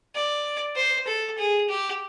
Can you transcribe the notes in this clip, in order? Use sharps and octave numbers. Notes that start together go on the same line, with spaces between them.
D5
C5
A4
G#4
G4